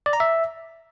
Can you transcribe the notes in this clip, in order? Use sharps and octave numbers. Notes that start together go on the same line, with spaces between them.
D5
A#5
E5